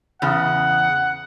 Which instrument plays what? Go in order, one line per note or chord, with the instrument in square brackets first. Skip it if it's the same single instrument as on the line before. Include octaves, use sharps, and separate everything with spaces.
[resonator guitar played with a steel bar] E2 C#3 [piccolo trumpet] F#5